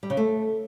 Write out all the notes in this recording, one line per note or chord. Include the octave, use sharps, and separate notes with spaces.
G3
C#3
A3